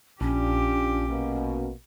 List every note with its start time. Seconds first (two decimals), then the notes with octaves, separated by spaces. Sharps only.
0.21 A#1 C#4 D4 F4 G4
1.09 B2 A#3